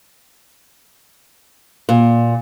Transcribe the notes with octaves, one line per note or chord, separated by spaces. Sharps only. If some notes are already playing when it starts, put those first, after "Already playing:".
A#2